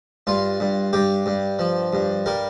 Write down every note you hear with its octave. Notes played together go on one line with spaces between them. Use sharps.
G2 F4
G2
G2 G4
G2
F3
G2
G3 A#4